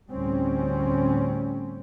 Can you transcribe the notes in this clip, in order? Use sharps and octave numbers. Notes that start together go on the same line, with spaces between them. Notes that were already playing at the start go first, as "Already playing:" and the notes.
D2 A2 G3 C4 C#4